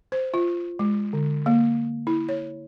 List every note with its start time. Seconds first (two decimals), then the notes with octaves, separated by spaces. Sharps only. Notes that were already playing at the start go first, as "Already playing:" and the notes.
0.12 C5
0.34 F4
0.79 G#3
1.13 D3
1.46 A#3
2.07 E4
2.29 C#5